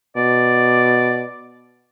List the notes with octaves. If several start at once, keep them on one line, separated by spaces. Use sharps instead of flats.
B2 D5